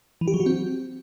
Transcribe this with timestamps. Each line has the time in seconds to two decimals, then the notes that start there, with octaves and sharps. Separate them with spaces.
0.21 E3
0.28 G4
0.34 F#3
0.40 F#4
0.46 C4